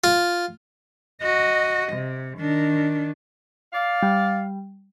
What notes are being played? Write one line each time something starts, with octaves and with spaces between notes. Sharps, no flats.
F4
F#4 D#5
C3
D#3 D4
D5 F5
G3